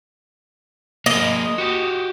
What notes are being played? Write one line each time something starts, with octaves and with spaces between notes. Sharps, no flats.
A#3 G#4 D#5
F#4 G4